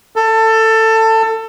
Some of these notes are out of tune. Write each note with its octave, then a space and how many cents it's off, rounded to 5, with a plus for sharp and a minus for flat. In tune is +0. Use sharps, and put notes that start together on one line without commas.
A4 +20